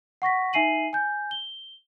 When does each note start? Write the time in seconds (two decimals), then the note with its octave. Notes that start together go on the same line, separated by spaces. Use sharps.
0.22 F#5 C#6 A#6 B6
0.53 D#4 E5 G#5 C7 D#7 F#7
0.93 G#5 G6
1.31 G7